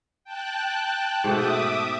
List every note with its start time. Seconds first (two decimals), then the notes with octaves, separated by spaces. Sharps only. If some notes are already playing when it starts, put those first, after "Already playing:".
0.24 G5 A5 F#6
1.24 G#2 B2 A3 E5 D6 D#6